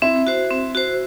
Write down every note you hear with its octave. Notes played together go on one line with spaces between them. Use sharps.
C4 E4
F#4 C5
C4
F#4 C5